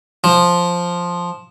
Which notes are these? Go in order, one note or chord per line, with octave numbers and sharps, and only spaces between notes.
F3